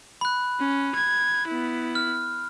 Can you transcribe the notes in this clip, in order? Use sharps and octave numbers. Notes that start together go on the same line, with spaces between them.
B5 F#6
C#4
G#6
B3 E4
F6